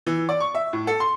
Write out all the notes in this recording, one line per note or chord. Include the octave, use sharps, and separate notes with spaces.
E3
D5
C#6
E5
A2
A4
C6